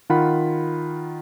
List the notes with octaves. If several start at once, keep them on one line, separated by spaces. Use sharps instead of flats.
D#3 F4 F#5 B5